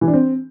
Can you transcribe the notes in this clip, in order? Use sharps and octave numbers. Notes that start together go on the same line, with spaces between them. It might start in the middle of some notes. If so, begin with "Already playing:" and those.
E3
D4
C4